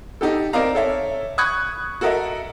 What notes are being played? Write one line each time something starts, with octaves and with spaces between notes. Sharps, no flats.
D#4 G4 A4
C4 A#4 D5 D#5 F5 A#5
A4 C#5 E5
B5 C#6 D#6 F#6 G#6
F#4 A4 A#4 D#5 E5